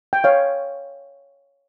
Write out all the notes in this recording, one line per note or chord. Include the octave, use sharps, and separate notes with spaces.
G5
C#5 F5